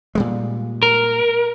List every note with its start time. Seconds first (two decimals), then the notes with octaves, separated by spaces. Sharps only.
0.15 A#2 G3 G#3
0.83 A#4